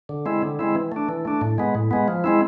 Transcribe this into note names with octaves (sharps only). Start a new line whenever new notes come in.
D3
G#3 C4 E4
D3
G#3 C4 E4
E3
A3 D4
E3
A3 D4
A2
G#3 B3
A2
G#3 B3
F3
G#3 C4 E4